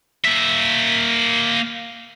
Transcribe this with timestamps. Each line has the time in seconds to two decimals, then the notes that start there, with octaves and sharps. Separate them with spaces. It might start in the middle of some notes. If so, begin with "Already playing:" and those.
0.24 A#3 E5